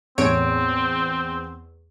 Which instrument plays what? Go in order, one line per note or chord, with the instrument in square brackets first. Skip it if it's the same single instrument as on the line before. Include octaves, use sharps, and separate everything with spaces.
[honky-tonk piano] E2 [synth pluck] A2 C#5 D7 [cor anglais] C4